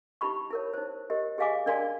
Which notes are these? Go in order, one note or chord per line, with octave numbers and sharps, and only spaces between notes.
D#4 E4 G4 B5 C#6
E4 A#4 C#5
D#4 C5
G4 A#4 D#5
G4 G#4 D#5 F5 G#5 D6
D4 A#4 D5 F5 G#5 C6